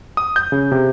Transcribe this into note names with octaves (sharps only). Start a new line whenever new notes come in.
D#6
G6
C#3
C3